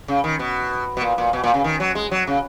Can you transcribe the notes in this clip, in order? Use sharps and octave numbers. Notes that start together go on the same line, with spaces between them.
C#3
D#3
B2
B2
A#2
A#2
B2
A#2
C#3
D#3
F#3
G#3
F#3
C#3